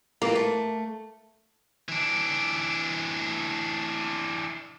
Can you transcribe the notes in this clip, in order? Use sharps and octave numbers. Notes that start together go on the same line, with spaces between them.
E3 A#3 F4 G4
A3
E3 D4